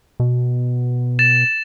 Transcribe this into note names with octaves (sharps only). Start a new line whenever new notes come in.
B2
A6 E7